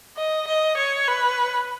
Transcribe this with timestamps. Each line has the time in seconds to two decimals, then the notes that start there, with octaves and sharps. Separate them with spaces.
0.17 D#5
0.47 D#5
0.78 C#5
1.08 B4